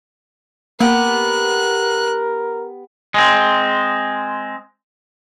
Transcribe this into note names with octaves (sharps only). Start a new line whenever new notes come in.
A#3 B3 G4 A#4 F#6
G#3 C4